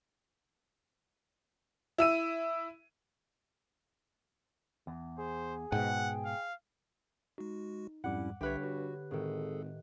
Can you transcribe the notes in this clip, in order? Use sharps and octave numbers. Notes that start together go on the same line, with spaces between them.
E4 E6 D#7
E2
G#4 C5
G#2 B2 F#5 G5
F5
G#3 D#4 F#4
F2 G#2 G3 C#4 E4 F#5 D6
B1 G2 D3 G4 B4 C#5 E5
F#4
G#1 A2 D#3 G#4 A4